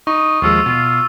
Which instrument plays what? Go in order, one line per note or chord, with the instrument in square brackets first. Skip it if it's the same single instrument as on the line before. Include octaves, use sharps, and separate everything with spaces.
[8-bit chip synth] D#4 [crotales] C#6 [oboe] D#6
[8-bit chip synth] D#2 F3 G#3 [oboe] F4 [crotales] C#6 D#6 E6
[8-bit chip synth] B2 [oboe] F4